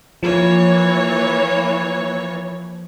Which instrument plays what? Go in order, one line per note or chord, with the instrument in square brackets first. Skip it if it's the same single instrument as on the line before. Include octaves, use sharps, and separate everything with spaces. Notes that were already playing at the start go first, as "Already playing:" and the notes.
[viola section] E3 A#3 C#5 [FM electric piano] F3